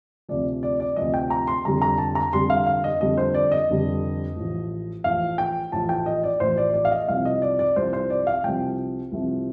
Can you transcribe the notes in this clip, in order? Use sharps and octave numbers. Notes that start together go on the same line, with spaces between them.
D2 C3 F3 D5
D5
D5
D2 C3 F3 D#5
G5
A#5
C6
F1 F2 D3 G3 A#5
A#5
A5
A#5
F1 F2 D3 G3 C6
F5
F5
D#5
F1 F2 D3 G3 D#5
C5
D5
D#5
F1 F2 D3 G3
A1 A2 F3
A1 A2 F3 F5
G5
A1 A2 F3 A5
G5
D#5
D5
A1 A2 F3 C5
D5
D5
F5
D#5
C2 C3 F3 F5
D#5
D5
D5
C2 C3 F3 C5
C5
D5
F5
C2 C3 F3 G5
C2 C3 F3